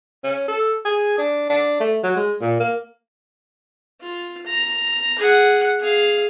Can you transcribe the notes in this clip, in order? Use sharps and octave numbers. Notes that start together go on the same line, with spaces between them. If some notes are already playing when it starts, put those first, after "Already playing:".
C#4
A4
G#4
D4
D4
A3
F#3
G#3
A#2
A#3
F4
A#5
G#4 F#5
G#4 F5